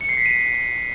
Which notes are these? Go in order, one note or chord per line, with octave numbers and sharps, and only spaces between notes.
C#7
C7
B6
D#7